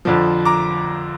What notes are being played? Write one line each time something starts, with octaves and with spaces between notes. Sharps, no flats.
F2 D3 F3
A#5 D6